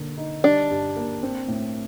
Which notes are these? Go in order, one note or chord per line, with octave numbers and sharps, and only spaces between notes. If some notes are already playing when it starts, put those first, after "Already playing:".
Already playing: D3 A#3
D#4
G3 D4
G2
A#3
C4
A2